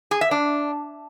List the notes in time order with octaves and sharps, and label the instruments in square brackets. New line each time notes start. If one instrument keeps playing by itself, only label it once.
[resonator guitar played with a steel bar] G#4
E5
D4